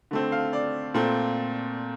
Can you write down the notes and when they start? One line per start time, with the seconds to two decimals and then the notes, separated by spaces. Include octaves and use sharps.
0.11 D3 A3 C4
0.32 F5
0.53 D5
0.94 A#2 A3 C4